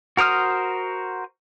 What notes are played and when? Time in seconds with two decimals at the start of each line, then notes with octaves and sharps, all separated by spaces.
0.17 F#4 A#4 C5 D#6 F6